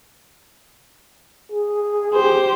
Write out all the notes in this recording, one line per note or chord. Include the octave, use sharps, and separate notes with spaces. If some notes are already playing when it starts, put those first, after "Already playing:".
G#4
G4 C5